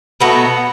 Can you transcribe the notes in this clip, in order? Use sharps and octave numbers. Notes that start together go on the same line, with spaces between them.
B2 F#3 A3 B3